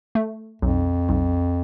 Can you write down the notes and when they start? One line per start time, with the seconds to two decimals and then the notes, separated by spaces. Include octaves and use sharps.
0.15 A3
0.62 B1 F2
1.09 B1